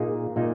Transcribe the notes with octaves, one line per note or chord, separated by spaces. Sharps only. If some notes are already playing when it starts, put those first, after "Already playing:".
Already playing: A#2 A#3 D#4 G#4
A#2 A#3 D#4